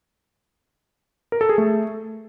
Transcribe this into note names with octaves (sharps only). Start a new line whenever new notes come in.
A#4
A4
G#4
A3